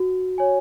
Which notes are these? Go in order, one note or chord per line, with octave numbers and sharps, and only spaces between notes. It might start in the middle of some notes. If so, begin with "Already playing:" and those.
Already playing: F#4
C#5 G#5